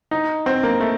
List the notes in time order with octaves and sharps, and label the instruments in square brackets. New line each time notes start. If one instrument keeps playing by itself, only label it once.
[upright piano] D#4
C4
A#3
A3